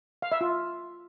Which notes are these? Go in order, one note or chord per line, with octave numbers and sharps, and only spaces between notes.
F5
E5
F4